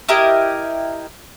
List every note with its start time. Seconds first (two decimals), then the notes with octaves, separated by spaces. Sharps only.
0.09 E4 G4 A#4 D#5